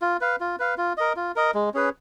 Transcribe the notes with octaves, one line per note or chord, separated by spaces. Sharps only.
F4
B4 F5
F4
B4 F5
F4
A#4 D#5
F4
A#4 D#5
G#3
C#4 G#4 B4